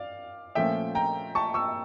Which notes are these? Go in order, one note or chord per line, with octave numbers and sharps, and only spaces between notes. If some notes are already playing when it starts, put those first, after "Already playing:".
Already playing: D5 F5
A#2 F3 A3 C#4 E5 G5
G5 A#5
A5 C#6
C#6 E6